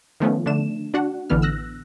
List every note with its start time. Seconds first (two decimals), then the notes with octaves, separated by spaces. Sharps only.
0.20 D#3 F3 A3 B3 C#4
0.46 D3 A3 D4 E7
0.94 D4 F#4 F#5
1.30 A1 D3 E3 B3 F6
1.42 E6 F#6 A#6